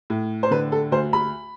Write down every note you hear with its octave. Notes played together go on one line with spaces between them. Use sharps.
A2
C5
D3 B4
A4
D2 C5
B5